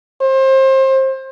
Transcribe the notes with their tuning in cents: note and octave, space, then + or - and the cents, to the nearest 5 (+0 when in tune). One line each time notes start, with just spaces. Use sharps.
C5 +30